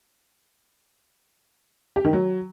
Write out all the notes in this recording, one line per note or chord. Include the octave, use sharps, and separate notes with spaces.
G4
D#3
F#3